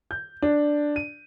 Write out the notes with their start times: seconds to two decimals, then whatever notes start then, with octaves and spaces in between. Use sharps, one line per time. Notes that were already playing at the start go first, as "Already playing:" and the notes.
0.11 G6
0.42 D4
0.96 D#7